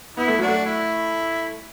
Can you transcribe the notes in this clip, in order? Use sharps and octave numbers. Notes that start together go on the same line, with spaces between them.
B3 E4
A3
F#3 D4 F#4
A3
E4